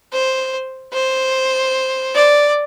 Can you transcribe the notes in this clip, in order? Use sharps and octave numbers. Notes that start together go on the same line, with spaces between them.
C5
C5
D5